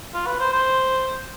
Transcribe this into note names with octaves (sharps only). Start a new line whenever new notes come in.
F4
B4
C5
C5